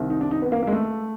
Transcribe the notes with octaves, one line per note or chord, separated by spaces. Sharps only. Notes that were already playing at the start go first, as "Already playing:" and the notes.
Already playing: C2 C3 D#3
D#4
D4
D#4
B3
A#3
A#3
G#3
A3